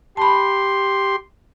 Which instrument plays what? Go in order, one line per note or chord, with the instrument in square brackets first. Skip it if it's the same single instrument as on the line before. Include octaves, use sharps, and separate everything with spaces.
[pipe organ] G4 C6 [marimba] A5 B5